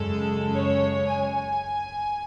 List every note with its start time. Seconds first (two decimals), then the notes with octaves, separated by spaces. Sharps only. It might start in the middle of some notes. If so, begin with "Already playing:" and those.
Already playing: F#2 C#3 G#3 A4
0.52 C#5
1.08 G#5